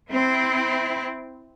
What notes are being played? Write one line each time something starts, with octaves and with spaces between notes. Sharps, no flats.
C4 E4